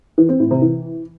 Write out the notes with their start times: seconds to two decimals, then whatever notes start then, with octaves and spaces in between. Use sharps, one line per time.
0.18 E3
0.29 C4
0.40 A2
0.51 C3
0.62 E3